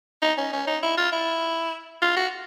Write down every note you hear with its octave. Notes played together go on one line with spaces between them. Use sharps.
D#4
C#4
C#4
D#4
E4
F4
E4
F4
F#4